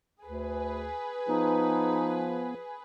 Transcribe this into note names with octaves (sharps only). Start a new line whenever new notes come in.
D2 G#4 B4
F3 B3 D#4